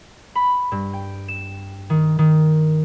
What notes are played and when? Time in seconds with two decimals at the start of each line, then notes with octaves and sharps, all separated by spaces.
0.35 B5
0.72 G2
0.93 G5
1.28 E7
1.90 D#3
2.19 D#3